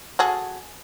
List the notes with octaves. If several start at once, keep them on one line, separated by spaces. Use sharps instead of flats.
F#4 G#4 A4